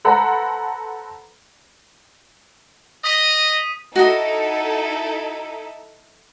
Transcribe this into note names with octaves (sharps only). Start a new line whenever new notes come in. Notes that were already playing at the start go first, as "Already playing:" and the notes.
A4 B4 C5 F#5 A#5 B5
D#5 D#6 B6 D#7
D#4 E4 F#4 A4 D#5